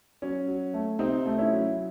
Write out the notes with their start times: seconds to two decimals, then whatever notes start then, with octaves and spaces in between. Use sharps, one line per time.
0.22 F#3 C#4
0.48 F#3
0.74 A3
0.99 C3 C4 D#4
1.26 A3
1.38 C#4 E4
1.52 F#3